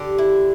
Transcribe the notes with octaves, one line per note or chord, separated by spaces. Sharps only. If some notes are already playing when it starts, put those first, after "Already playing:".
Already playing: D3 G4
E4